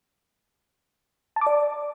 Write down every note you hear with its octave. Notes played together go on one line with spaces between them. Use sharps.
A5
D6
D5